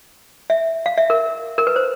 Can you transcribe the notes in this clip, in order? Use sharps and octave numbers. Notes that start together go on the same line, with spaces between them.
E5
F5
E5
A#4
A#4
B4
C5